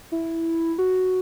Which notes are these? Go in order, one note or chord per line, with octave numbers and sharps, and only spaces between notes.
E4
F#4